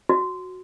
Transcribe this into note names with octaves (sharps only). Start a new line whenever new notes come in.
F#4